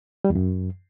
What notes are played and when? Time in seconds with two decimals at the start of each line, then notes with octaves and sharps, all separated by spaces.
0.25 G3
0.30 E2
0.35 F#2